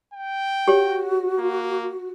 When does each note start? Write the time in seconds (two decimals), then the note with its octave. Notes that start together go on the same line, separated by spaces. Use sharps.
0.14 G5
0.68 F#4 G4 C#5
1.39 A#3